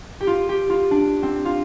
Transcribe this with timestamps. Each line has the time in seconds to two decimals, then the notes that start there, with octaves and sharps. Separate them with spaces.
0.21 G4
0.27 F4
0.49 G4
0.70 F4
0.91 D4
1.23 C4
1.45 F4